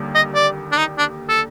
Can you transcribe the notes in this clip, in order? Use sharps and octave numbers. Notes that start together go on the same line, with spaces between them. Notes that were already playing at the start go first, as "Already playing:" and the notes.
Already playing: D#2 D3 G3 A#3
D#5
D5
D4
D#4
D4
A4